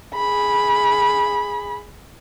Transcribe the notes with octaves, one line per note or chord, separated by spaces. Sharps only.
G#4 B5